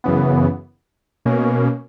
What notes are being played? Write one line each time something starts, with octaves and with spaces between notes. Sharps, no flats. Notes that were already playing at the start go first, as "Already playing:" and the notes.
F#2 C#3 E3 B3
B2 A#3 C#4